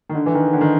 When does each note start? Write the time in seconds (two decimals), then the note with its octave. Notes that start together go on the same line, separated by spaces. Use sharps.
0.09 D#3
0.15 D3
0.26 E3
0.34 D#3
0.53 D3
0.61 D#3